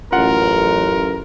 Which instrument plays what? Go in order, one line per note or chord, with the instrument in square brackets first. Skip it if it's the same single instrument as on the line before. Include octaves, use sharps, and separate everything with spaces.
[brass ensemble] A1 F#2 [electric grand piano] F4 F#5 [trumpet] A#4